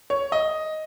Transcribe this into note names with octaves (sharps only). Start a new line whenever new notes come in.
C#5
D#5